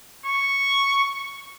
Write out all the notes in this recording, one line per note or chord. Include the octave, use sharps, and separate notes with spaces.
C#6